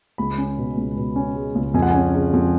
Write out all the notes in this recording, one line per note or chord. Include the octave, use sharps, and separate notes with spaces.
C#2 B5
C#4
B2
C#2
B2
C#4
G#3
C#2
F2 G#5
F#5
C#4 G#5
C#3
F2